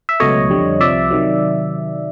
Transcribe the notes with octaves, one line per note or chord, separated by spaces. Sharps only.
E5
C#2 B2 F#3 A3 C#5 D#5
F2 D3 G3
C2 C3 F3 D5 E5
C3 D#3 F#3